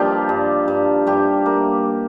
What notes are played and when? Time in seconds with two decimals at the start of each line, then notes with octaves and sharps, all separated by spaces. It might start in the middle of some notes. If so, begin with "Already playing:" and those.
Already playing: G2 F3 A#3 D#4 F4 G4
0.29 G2
0.68 G2
1.07 G2 G4
1.46 A#3